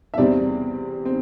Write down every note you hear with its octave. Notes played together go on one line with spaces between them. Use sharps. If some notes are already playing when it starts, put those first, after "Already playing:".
E5
E2 C3 G3 C4 D5
C4